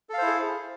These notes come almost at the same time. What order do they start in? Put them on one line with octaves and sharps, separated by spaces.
A4 F5 C5 E4 G#4